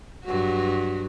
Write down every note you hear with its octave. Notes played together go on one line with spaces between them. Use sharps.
G2 F#3 F#4